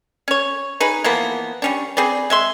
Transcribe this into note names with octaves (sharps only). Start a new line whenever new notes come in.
C#4 C#5
D#4 G#4 B4
E3 F3 A#3 B3
G3 C#4 D4
C4 G#4 B4 D5
G#3 E5 C6